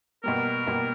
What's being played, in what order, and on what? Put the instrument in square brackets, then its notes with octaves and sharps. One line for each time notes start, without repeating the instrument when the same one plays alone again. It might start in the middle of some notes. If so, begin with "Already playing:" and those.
[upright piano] B2 G3 A#3 [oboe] A#4
[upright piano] B2 G3 A#3